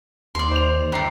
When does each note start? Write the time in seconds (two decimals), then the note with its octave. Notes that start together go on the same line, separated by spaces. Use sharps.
0.35 D#2 D5 C6
0.51 C5 F7
0.92 G1 G4 A4 A#5 C7